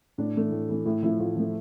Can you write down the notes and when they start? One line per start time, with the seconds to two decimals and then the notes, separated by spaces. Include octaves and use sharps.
0.18 A2 D4
0.35 E3 A3
0.52 A2
0.69 E3 A3
0.85 A2 E4
1.03 F3 A3 E4
1.19 A2 F4
1.36 F3 A3